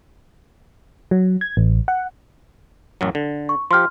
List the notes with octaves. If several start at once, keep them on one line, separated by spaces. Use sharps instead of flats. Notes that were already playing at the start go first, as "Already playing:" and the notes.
F#3
G#6
A1
F#5
A1 F#2 F#3
D3
C#6
F3 G4 C6 F6